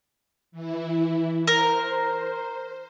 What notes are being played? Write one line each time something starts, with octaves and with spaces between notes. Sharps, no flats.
E3 E4
A#4 C5